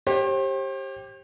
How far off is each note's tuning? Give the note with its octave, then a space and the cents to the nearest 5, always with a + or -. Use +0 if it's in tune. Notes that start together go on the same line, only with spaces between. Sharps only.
G4 +0 C5 +40